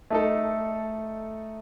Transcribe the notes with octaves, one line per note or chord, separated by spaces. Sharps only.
A3 D#4 A4